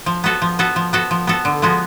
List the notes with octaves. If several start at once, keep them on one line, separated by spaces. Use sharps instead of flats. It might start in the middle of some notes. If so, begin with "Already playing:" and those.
F3
B3 F#4 A4
F3
B3 F#4 A4
F3
B3 F#4 A4
F3
B3 F#4 A4
D3
F3 G#3 B3 F#4